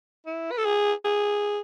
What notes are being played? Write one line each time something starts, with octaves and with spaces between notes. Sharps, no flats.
E4
B4
A4
G#4
G#4